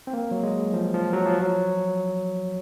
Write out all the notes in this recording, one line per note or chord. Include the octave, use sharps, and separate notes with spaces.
C4
A#3
F#3
G#3
F3
F3
F#3
F3
F#3